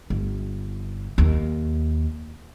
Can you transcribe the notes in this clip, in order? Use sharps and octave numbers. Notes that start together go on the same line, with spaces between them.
G1
D#2